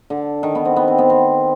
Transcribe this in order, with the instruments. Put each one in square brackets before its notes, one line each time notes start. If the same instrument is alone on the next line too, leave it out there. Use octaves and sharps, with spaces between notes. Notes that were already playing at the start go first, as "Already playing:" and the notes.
[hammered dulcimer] D3
D#3
B3
C4
B3
C4
B3
C4